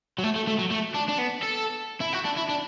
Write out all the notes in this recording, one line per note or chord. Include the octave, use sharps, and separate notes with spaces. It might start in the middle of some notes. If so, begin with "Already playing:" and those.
F#3
A3
A3
A3
F#3
A3
D4
D4
B3
A4
E4
F#4
D4
E4
D4